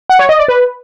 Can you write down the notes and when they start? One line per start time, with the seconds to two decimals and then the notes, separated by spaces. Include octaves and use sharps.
0.09 F#5
0.19 C#5
0.29 D#5
0.39 D5
0.48 B4